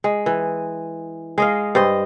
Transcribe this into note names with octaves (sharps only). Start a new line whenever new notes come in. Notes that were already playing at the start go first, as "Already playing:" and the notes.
G#3
E3
G#3 D#5 F5
G2 C5 D#5